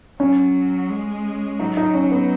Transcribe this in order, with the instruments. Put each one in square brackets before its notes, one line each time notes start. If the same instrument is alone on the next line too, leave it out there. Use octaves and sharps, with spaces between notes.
[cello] F#3 [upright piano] C#4
[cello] G#3
[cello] F#3 [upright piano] D#4
[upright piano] D#4
C#4
B3